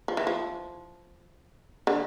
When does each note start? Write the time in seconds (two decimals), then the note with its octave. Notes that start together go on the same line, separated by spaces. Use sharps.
0.08 F3
0.17 E3
0.27 F3
1.87 D3